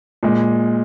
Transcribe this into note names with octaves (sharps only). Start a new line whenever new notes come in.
A#2 G#3